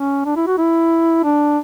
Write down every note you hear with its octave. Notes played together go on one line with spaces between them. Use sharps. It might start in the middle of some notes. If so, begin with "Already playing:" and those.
Already playing: C#4
D4
E4
F#4
E4
D4